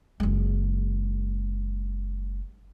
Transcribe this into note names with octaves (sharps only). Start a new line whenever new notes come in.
F#1 G#3